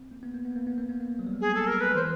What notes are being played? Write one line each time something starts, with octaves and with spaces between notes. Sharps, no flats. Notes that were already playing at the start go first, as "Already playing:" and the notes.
Already playing: C4
A#3
B3
A#3
B3
A#3
B3
A#3
B3
A#3
F#3
G3
G#3
G#4
A4
A#4
B4
E3 C5